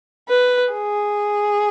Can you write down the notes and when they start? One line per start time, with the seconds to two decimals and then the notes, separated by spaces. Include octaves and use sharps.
0.29 B4
0.73 G#4